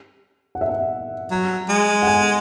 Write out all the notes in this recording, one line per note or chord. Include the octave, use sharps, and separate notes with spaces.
F#5
E5
F#5
F#3
G#3
F#5
G#5